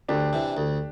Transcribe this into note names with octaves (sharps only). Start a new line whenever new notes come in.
D2 D4 G4
C3 E3
D2